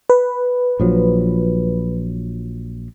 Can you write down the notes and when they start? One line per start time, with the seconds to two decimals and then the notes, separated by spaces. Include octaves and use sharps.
0.10 B4
0.80 A#1 F3 F#3